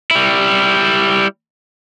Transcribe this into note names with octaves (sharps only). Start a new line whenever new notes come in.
G3 E4